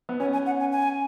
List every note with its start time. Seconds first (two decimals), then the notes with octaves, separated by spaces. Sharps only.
0.09 B3
0.20 C#4 G#5
0.33 G#5
0.46 F#5
0.60 G#5
0.72 G#5